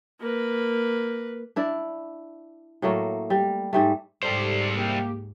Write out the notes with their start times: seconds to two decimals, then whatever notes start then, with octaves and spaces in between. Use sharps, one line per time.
0.20 A#3 B4
1.56 D4 E4 D5
2.82 A2 F#3 A3 A#3
3.30 G3
3.73 G#2 G3 A3
4.23 C#2 G#2 G3 G4 A4 C5 D5
4.75 A#3 G4